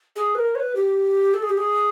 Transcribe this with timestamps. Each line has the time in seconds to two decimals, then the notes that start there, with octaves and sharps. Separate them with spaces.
0.16 G#4
0.35 B4
0.39 A#4
0.55 C#5
0.60 B4
0.76 G4
1.34 A4
1.42 G#4
1.49 G4
1.57 G#4